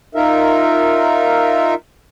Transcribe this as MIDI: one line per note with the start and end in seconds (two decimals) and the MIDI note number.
0.15 1.74 63
0.15 1.74 65
0.15 1.74 70
0.15 1.74 76